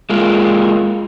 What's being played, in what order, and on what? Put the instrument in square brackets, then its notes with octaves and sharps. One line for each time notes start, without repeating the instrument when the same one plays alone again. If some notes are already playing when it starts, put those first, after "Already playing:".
[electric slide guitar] G#3 A#3 F4